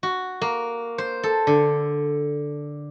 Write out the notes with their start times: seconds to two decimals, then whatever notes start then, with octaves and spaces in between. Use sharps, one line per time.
0.03 F#4
0.42 A#3
0.98 C5
1.23 A4
1.47 D3